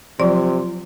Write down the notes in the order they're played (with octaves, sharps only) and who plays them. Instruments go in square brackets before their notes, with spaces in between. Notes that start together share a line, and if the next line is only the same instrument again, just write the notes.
[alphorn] C3 [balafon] F3 F#3 [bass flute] F4 [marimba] D5